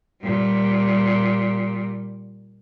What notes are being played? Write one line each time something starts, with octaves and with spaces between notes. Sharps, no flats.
A#2 G3